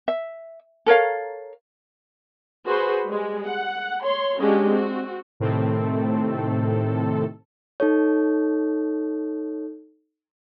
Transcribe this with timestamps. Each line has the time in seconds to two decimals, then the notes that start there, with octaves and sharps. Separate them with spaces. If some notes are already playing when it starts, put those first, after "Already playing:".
0.08 E5
0.86 A4 A#4 C#5 F5
2.68 F#4 G#4 B4 C5
3.05 G3 G#3
3.45 F#5
4.01 C#5 C6
4.38 G#3 C#4 D4 F#4 G4
4.69 C4 F#4
5.40 A2 C3 D#3 A3 C4 A4
7.80 D#4 A4 C#5